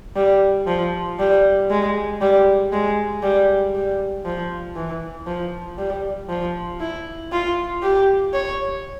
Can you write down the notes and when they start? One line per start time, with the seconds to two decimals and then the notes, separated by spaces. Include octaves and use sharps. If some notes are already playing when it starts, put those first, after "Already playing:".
0.16 G3
0.67 F3
1.19 G3
1.70 G#3
2.21 G3
2.73 G#3
3.23 G3
3.75 G3
4.25 F3
4.76 E3
5.27 F3
5.78 G3
6.29 F3
6.81 E4
7.32 F4
7.83 G4
8.34 C#5